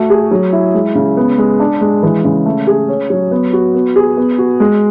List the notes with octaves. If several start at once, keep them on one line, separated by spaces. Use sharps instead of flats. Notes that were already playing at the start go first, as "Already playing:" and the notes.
Already playing: A3 F#4
G#4
F#3
E4
G#3
C#3
B3
G#3
D4
G#3
E3
C#3
A3
G#4
C#4
F#3
B3
F#4
B3
G#4
B3
F#4
G#3